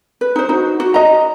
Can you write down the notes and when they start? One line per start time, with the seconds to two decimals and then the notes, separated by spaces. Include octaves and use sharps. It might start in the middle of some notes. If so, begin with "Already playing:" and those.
0.21 B4
0.36 D#4 C5
0.49 D#4 F#4 C5
0.80 F#4
0.94 D#5 A#5